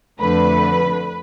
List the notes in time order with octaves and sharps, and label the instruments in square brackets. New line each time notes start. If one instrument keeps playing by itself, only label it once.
[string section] F2 D3 A3 B4